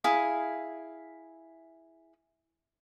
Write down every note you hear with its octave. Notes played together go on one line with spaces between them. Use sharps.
E4 G#4 F5